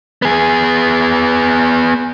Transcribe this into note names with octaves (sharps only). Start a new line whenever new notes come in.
B3 G#4